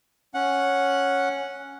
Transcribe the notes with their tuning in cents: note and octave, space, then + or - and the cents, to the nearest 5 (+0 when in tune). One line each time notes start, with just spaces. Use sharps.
C#4 +0 F#5 -5